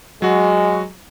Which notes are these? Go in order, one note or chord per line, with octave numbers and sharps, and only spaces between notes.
F#3 G#3 F#4